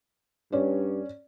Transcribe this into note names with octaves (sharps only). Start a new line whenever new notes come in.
G2 C#4 D5